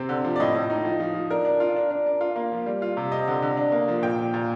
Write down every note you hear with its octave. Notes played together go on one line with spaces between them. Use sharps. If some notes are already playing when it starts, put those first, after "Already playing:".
Already playing: C3 C4
D3
F3
D5
A2 D#5
A2
D#4
F3
F3
F3
D4 A#4
D4
F4
D4
D4
D4
F4
A#3
F3
G3
F4
C3
C4 D#5
D3
D3
D4
A#3
F3
A#2 G5
F3
A#2